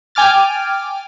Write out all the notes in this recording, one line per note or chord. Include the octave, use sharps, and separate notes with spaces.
G5 G#5 D6 F6 A6